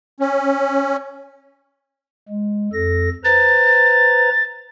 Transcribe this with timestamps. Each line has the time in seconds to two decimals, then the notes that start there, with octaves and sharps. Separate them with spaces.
0.20 C#4
2.29 G#3
2.73 F2 A4 A#6
3.24 B4 C5 A#5 A6